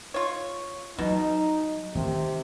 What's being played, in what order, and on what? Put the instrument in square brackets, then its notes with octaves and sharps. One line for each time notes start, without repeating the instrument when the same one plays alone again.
[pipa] F4 C#5
[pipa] B2 [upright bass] F#3 [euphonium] D#4
[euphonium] C3 [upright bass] D#3